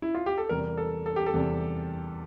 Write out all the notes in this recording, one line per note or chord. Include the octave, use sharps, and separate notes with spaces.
E4
F4
G4
A4
E2 C3 G3 A#4
A4
A4
G4
A4
E2 C3 G3